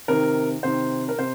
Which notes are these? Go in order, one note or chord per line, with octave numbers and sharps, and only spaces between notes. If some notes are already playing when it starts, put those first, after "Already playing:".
C3 D#3 A#4
C3 D#3 C5
A#4
C3 C5